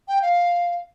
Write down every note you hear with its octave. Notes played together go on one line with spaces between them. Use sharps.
G5
F5